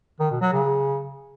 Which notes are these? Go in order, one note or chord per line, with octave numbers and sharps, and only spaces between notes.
D#3
B2
F#3
C#3